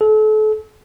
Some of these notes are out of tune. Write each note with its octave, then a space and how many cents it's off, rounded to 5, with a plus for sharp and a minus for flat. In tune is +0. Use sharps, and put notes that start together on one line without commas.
A4 -35